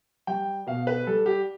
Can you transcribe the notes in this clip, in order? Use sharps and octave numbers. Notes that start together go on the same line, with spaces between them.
G3 G5
B2 F5
B4
G3 A4
G4